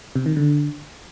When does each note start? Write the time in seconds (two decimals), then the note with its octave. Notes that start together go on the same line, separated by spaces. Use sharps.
0.15 C3
0.26 D#3
0.37 D3